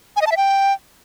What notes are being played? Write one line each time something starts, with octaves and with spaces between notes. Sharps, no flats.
G#5
D#5
A5
E5
G5